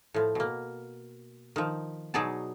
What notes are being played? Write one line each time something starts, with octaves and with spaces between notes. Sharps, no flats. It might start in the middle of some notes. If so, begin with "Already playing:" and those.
A2 F3
B2 A#3
D#3 F3
B2 F#3 D#4 G#4 D5 A5